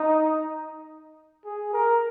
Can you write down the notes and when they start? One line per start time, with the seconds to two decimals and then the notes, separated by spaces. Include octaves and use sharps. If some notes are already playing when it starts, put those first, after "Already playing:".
Already playing: D#4
1.45 G#4
1.73 A#4